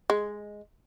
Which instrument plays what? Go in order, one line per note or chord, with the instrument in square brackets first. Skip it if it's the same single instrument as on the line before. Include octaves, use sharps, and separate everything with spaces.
[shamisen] G#3